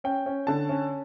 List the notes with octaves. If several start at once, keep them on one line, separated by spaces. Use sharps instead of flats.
C#4 G5
C#4
D3 A5
C#4